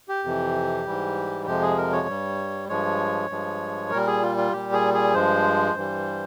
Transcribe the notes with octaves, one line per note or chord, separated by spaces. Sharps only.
G4
F2 C3 E3
G#2 E3 G3
F2 C3 F3 G#3 G4
G#4
A#4
C#5
G2 G3
G2 F3 G#3 C#5
G2 F3 G#3
A#2 G3 A#4
G#4
F4
F4
A#2 G3 G4
G#4
G#4
G2 F3 G#3 C5
G2 E3 G3